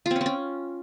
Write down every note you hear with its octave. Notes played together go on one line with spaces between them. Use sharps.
F4
C4
C#4
C4
C#4